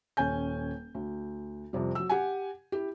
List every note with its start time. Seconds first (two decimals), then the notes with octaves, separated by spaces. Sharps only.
0.17 D#1 C#4 G#5 G6
0.95 D2
1.73 F2 C3 G3
1.95 F#3 E6
2.09 G4 F#5 G#5
2.72 E4 G4